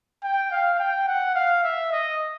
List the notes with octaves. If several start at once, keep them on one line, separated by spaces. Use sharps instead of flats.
G5
F5
G5
F#5
F5
E5
D#5